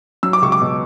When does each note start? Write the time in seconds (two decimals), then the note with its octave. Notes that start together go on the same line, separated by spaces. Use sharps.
0.23 F#3 E6
0.33 D6
0.42 C#2 C#6
0.52 D6
0.61 B2